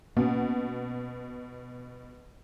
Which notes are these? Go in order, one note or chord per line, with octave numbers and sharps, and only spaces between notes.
B2 A#3 B3 C#4